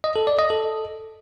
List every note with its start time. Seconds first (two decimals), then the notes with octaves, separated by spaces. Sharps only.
0.04 D#5
0.16 A4
0.27 D5
0.39 D#5
0.50 A4